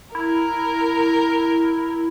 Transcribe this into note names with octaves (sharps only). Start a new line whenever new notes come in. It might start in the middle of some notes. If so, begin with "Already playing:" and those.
E4 A#4